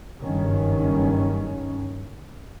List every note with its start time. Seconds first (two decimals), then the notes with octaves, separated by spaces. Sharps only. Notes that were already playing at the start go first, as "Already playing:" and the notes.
0.21 F#1 G2 D#3 C#4